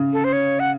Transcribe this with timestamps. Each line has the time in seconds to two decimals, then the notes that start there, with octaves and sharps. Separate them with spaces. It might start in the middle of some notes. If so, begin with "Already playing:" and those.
Already playing: C#3
0.13 A4
0.24 C5
0.33 C#5
0.60 F#5